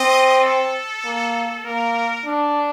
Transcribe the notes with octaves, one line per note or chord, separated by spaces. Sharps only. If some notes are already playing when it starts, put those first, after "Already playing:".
Already playing: C4 D#5
A4
A#3
A#3 A#4
D4